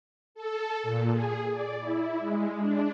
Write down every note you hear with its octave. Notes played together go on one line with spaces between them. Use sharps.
A4
A#2
G#4
D5
E4
G#3
D4